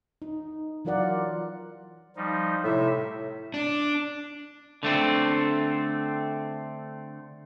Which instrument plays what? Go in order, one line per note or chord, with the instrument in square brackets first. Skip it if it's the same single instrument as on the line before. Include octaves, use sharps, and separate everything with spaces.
[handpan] D#4
E3 F#3 F4 A#4 D5 F#5
[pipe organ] F3 G3 D#4
[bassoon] A2 [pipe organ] C3 E5
[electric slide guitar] D4
[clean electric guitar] D3 A3 C4